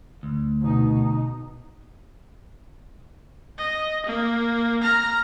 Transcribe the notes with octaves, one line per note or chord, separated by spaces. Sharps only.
D2
B2 D#4
D#5
A#3
A#5 F6